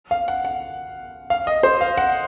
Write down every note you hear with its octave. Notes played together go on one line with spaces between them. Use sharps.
F5
F#5
F#5
F5
D#5
C5
F5
F#5